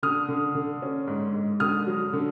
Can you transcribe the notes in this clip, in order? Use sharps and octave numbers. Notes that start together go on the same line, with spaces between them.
D3 D#6 F6
D3
D3
C#4
G#2
G#2
D3 D#6 F6
F#3
D3